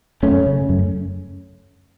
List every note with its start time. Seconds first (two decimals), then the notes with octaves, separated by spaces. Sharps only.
0.23 F#2 A3 C#4
0.46 C#3
0.69 F#2